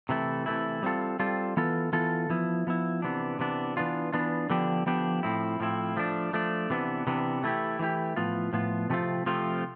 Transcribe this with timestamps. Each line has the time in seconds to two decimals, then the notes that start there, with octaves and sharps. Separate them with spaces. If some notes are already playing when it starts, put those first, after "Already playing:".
0.09 C3 E3 A3 E4
0.46 C3 E3 A3 E4
0.83 G3 C4 F4 A4
1.19 G3 C4 F4 A4
1.57 E3 B3 F4 A4
1.93 E3 B3 F4 A4
2.30 F3 B3 E4
2.67 F3 B3 E4
3.02 C3 E3 B3 D4
3.39 C3 E3 B3 D4
3.77 E3 B3 D4 F4
4.13 E3 B3 D4 F4
4.50 D3 F3 B3 D4 G4
4.86 D3 F3 B3 D4 G4
5.23 A2 F3 C4 E4
5.60 A2 F3 C4 E4
5.97 F3 A3 D4
6.33 F3 A3 D4
6.70 C3 E3 B3 D4
7.07 C3 E3 B3 D4
7.43 E3 A3 E4 G4
7.79 E3 A3 E4 G4
8.16 A2 F3 B3 F4
8.53 A2 F3 B3 F4
8.90 C3 F3 A3 C4 F4
9.26 C3 F3 A3 C4 F4